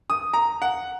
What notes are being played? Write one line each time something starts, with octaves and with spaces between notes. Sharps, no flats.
D#6
A#5
F#5